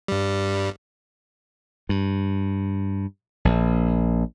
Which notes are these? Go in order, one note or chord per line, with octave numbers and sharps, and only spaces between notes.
G2 G3
G2
A#1